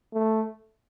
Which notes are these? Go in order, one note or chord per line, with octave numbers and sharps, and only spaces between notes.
A3